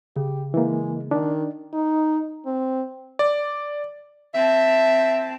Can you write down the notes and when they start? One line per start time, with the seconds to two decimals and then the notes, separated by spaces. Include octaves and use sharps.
0.16 C#3 G4
0.54 E3 G#3 A#3
1.11 D#3 D4
1.73 D#4
2.46 C4
3.19 D5
4.34 C4 E5 A5